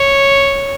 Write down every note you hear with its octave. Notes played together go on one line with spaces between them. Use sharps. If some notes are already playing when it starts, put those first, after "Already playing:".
Already playing: C#5